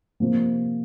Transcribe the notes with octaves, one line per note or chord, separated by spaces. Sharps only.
C3 F3 A#3